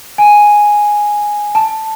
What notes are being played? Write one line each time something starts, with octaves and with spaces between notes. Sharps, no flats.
G#5
A5